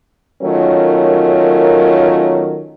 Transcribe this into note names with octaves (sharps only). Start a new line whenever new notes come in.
D#3 F#3 A3 C#4 F4 A#4